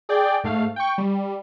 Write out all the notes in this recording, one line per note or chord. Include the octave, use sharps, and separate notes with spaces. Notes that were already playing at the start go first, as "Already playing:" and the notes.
G#4 D5 G5
G#2 A3 F5
G5 C#6
G3